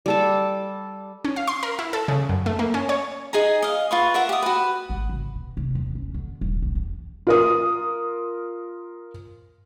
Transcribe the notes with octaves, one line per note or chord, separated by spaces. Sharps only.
G3 A4 A5
C#4
F5
C6
A#4
E4
A4
C#3
F#2
A3
A#3
C#4
C#5
D#4 G#4 G#5 A#5
D#5 F5
F4 B4 C#6
A#4 E5 F#5
G4 D#6
F#4 B4
G#1
C#3
B2
C3
D#2
C#4
D3
D#1
A#1
E2
F4 A#4 D#6